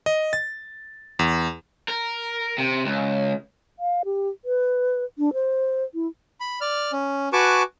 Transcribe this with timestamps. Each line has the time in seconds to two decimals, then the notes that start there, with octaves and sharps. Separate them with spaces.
0.06 D#5
0.33 A6
1.19 E2
1.88 A#4
2.58 C3
2.86 C#2
3.79 F5
4.05 G4
4.45 B4
5.18 D4
5.33 C5
5.94 E4
6.40 B5
6.61 D5 F6
6.92 C#4
7.33 F#4 B4 G#5 A5 C#6 D6